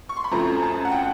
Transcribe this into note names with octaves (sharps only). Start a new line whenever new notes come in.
C#6
C6
B5
F#2 C#3 F3 A3 C4 A#5
A5
F#5
G5